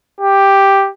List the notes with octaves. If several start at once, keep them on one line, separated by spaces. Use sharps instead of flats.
G4